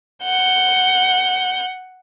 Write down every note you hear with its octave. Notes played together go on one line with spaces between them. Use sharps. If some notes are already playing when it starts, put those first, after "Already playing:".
F#5 G6